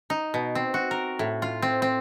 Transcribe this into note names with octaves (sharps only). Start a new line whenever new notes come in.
D#4
B2
C4
F#4
A#4
A2
F4
C4
C4